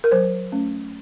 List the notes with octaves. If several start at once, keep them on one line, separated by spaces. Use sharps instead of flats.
A#4
F#3 C5
A3 C#4